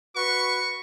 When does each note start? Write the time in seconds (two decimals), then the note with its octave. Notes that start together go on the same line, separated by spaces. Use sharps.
0.16 F#4 B4 C#6